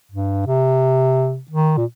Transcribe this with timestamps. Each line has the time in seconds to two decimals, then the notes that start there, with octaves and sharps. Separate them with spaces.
0.11 G2
0.46 C3
1.50 D#3
1.77 A#2